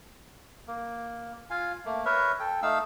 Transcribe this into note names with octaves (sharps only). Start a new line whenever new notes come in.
A#3
F4 F5 G#5
A3 A#3
A#4 B4 C#5 E5
A4 G5
A3 D#4 F5 E6